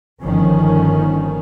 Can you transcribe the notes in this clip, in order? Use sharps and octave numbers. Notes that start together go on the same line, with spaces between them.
G1 D#3 F3 C#4